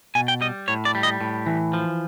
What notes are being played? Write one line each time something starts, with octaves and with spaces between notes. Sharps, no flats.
B2 G#5
G5
G3 D#5
A2 C#5
D5
G3
D#5
A2
E3
F3